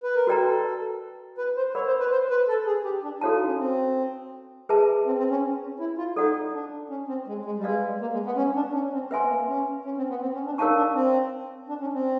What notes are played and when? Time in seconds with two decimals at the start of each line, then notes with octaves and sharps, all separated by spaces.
0.03 B4
0.16 A#4
0.27 F#4 A4 B4 D5 G5 A#5
0.46 A4
1.38 B4
1.57 C5
1.75 A#4 C#5 D5 F#5 B5
1.87 C5
2.00 B4
2.11 C5
2.30 B4
2.48 A4
2.66 G#4
2.84 G4
3.04 D4
3.21 E4 F#4 A4 C#5 F5 A5
3.34 D#4
3.47 C#4
3.59 C4
4.69 G#4 B4 E5 A5
5.06 C4
5.18 C4
5.30 C#4
5.80 E4
5.98 F4
6.16 D#4 A4 D5 F#5
6.54 D4
6.90 C#4
7.08 C4
7.28 G#3
7.45 G#3
7.58 G3
7.64 G#3 B4 D5 F5
8.01 A#3
8.13 G#3
8.26 B3
8.37 C#4
8.56 D4
8.74 C#4
8.93 C4
9.11 B3 B4 E5 G#5 C6
9.29 A#3
9.48 C#4
9.85 C#4
9.97 C4
10.10 B3
10.22 C4
10.34 C#4
10.46 D4
10.58 D#4 A#4 C#5 F5 A5 C#6
10.77 D4
10.95 C4
11.69 D4
11.81 C#4
11.94 C4